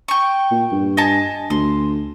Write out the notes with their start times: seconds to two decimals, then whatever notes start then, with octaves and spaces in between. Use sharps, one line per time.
0.08 G5 C#6
0.51 A#2
0.72 G2
0.97 D#5 G#5 A5
1.50 D2 C6